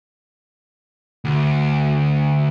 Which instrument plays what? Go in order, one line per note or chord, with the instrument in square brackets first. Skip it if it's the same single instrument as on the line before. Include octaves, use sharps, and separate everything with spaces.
[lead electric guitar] D2